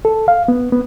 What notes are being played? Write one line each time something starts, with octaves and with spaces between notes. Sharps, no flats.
A4
F5
B3
B3